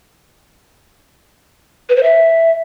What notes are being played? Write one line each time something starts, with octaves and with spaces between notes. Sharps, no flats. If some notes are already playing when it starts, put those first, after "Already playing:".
B4
C5
E5